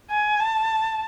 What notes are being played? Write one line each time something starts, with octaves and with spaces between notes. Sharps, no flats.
G#5
A5